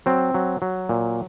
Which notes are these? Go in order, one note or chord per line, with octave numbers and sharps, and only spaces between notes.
F#3 C4
F#3
F#3
A#2